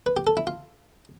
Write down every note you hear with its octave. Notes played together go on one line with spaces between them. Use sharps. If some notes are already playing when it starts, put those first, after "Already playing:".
B4
G4
A4
E4
F4